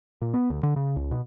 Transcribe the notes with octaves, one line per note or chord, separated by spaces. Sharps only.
A#2
B3
D2
D3
C#3
C#2
B2